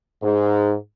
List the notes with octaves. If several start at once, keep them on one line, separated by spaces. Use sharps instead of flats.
G#2